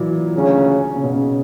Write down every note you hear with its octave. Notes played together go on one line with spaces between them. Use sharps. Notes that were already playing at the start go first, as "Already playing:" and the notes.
Already playing: A#2 E3 F#3
D2 C#3 F#3 C#4
C#3
B2
C#3